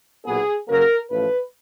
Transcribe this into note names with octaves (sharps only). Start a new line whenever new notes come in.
B1 A#2 F#3 B3 G#4
F#2 C#3 F#3 A#3 A#4
A1 A2 F3 A3 B4